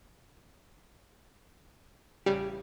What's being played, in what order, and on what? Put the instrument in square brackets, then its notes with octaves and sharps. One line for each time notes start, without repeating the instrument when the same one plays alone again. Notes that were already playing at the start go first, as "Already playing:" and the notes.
[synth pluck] A1 C#3 G3 [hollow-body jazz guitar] G4